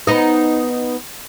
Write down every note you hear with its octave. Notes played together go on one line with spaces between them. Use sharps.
B3 D#4 D#5